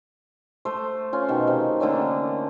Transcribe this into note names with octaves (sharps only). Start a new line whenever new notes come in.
A3 C5
C#4 F4
B2 D#3
C3
D3 A3 A#3 C#4